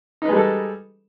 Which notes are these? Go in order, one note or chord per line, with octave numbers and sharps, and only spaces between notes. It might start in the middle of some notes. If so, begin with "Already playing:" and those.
G3 G#3 D#4 A4 B4